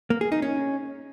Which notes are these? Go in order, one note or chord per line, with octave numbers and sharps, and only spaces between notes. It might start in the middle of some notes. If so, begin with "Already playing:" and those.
A#3
G#4
D#4
C#4